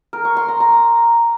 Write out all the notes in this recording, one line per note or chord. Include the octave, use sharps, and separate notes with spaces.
A#4
C#6
C6
A#5
A#5